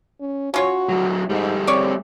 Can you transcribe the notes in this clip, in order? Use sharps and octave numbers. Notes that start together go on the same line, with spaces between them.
C#4
C#4 F4 F#4 C#5
F#3 A3
G#2 G3 A3
C4 C#5 D5